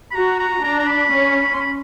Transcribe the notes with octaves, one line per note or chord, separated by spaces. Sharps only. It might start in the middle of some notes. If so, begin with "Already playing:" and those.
B5
F#4 A#5
A#5
D4 A#5
A#5
B5
C#4
C6
B5